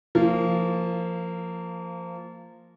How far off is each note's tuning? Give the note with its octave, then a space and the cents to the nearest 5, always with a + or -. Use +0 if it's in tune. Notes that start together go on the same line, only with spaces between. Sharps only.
F3 -10 A#3 -25